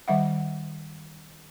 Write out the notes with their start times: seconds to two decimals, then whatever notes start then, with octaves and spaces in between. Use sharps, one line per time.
0.08 D#3 G3 E5 F#5